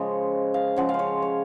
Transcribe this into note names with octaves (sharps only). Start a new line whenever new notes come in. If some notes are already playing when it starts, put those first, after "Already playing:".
Already playing: C#3 F3 G#3 C#5 D#5
F5
C#3 F3 G#3 F#5
F5
C5
C#5
C#5